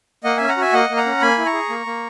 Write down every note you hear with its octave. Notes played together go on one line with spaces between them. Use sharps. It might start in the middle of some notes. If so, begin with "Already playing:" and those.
A#3 D#5 F#5
C#4 E5 G#5
F#5 A#5
F#4 E5 G#5
A#3 D#5 F#5
A#3
F#5 A#5
C#4
A#3 G#5 B5
E4
A#5 C#6
G#4
A#3
A#3